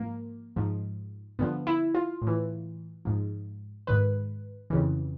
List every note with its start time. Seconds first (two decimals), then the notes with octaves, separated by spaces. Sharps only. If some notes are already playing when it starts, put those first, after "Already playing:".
Already playing: G#2 F3 A#3
0.56 G#2 F3
1.39 G2 D3 F3 B3
1.67 E4
1.95 F4
2.22 A2
2.27 E3
3.05 G#2 F3
3.87 G#2 D#3 B4
4.70 F2 C#3 E3